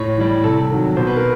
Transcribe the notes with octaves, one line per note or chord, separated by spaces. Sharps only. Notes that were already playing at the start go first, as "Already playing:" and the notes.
Already playing: A2 C#5
E3 G3
C3 A4
D#3 F#3
B2 C5
B4
A#4